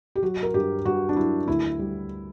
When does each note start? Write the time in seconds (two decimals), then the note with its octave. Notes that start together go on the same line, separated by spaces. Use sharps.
0.16 G4
0.22 F#3 F#4
0.43 A#4
0.54 G2 G4
0.85 G2 F#4
1.09 D4
1.16 F#3 E4
1.48 D2 E4
1.79 G3